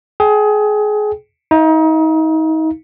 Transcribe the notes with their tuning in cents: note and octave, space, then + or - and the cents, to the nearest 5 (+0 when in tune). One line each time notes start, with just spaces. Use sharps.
G#4 +25 G5 +0
D#4 +35 F5 -25